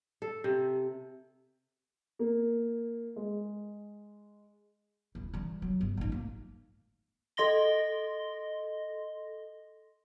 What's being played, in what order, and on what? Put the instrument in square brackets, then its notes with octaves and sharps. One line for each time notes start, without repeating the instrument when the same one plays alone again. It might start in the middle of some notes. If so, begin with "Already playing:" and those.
[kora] A4
C3
[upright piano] A#3
G#3
[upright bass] D#1 E4
E3 G3
F#3
G1
A1 D#4
A#3
[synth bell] A4 D#5 C6 A#6 G7